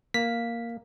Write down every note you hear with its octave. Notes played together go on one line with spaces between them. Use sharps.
A#3 B6